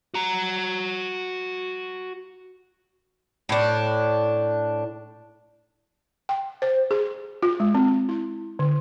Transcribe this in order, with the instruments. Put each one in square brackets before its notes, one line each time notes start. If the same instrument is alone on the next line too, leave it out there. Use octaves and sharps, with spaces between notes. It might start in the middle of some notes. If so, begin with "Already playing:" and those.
[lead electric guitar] F#4 A#5
[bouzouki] A2 D4
[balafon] G5
C5
G#4
F4
G#3
C4
E4
D3